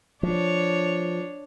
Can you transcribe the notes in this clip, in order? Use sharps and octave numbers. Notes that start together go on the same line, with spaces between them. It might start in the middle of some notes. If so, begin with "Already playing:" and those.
F3 D4 C#5